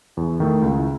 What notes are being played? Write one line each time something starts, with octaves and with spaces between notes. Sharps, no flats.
E2 E4
D#3 A3 D#4
C#2